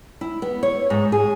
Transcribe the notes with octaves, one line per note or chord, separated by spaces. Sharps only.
E4
B3
C#5
G#2
G#4